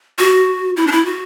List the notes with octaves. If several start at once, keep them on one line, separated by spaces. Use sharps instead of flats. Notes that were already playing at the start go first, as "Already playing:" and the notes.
F#4
E4
D4
E4
F#4